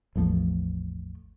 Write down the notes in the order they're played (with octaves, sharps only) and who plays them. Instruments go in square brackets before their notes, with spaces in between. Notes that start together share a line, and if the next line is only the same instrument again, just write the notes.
[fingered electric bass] A1 E2 F3 A3